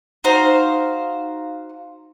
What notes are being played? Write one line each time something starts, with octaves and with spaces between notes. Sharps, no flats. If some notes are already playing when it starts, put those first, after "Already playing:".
D#4 F#4 C5 F5